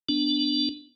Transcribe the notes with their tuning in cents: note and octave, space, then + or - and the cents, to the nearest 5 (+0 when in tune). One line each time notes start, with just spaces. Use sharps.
B3 +0 D4 +0